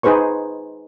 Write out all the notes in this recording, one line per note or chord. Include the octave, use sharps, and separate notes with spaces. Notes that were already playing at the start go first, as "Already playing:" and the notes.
D#4 G#4 B4 C5 C#6